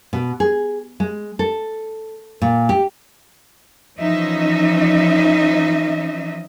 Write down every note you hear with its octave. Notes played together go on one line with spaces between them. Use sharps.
B2
G#4
G#3
A4
A#2
G4
E3 F3 C#4 D#4 D#5 E5